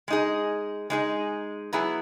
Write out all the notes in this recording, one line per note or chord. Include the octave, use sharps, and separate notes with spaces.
G#3 D#4 G#4
G#3 D#4 G#4
F#3 B3 E4 G#4